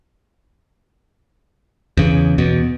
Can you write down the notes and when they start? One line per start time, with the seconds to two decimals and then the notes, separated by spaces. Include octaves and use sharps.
1.97 E2 C#3
2.38 E2 B2